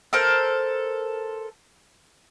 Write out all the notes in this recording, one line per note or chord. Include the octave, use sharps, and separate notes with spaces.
A4 A#4 C5